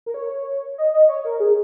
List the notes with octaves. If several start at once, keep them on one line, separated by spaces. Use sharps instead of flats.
A#4
C#5
D#5
D#5
C#5
A#4
G#4